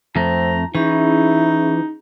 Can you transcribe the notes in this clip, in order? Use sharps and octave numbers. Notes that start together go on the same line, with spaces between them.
F2 A3 C4 A#5
E3 C#4 D#4 E4 G#4